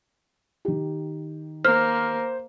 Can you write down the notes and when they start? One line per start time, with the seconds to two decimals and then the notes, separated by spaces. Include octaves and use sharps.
0.65 D#3 G4
1.65 A#3 C5 F6